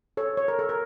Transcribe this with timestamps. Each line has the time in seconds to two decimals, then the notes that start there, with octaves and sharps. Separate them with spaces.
0.17 A4 C#5
0.37 C#5
0.48 A#4
0.59 A4
0.69 A#4